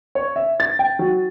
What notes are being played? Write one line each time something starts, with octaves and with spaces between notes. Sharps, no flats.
C#5
E5
A6
G5
F#3